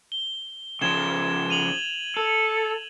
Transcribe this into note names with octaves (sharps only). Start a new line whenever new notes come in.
G7
C#3 F3 G#6 E7 G7
D#7 F7 F#7
A4